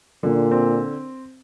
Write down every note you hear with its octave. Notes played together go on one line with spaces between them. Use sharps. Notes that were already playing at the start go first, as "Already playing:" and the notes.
A#2 D3
C4